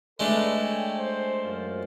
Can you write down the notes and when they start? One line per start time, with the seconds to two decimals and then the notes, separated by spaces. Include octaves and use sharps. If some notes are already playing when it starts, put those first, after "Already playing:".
0.20 G#3 A3 D4 A4 B4
0.60 C#5 G5 G#5
0.98 C5
1.43 F#2 F4